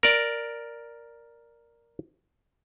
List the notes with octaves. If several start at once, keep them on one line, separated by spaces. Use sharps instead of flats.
A#4 D5